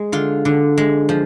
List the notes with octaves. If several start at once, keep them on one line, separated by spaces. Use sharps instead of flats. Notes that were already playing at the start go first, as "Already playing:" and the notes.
Already playing: G#3
D3 F4
D3
G#3
F3